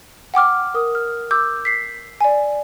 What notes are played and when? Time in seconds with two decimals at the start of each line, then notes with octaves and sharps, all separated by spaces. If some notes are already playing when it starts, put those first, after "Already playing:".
0.34 F#5 G5 D6 F6
0.74 A#4 D#6
0.95 F6
1.31 D6 E6 G6
1.65 B6 C7
2.21 D5 G#5